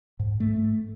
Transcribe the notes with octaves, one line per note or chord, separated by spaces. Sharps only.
G#2
A3